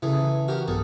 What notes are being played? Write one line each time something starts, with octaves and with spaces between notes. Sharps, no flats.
C#3 E3 C#4 G#4 A4
F#4 G4 A#4 F6
B1 G2 B3 G#4 A4 A5